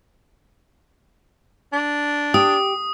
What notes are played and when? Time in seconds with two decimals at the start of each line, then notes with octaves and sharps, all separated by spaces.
1.73 D4
2.34 G4 D#6